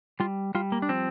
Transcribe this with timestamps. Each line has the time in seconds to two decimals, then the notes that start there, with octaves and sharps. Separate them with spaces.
0.20 G3 F4
0.55 G3 F4
0.72 A#3
0.82 D4
0.89 F3 C4